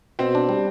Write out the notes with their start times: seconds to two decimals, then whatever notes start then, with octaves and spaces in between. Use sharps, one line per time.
0.19 B2 C4
0.35 D4
0.49 G3